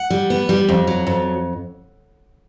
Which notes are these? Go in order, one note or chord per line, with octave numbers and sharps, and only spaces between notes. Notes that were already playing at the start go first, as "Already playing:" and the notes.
Already playing: F#5
G3
B3
G3
F2
F#3
F2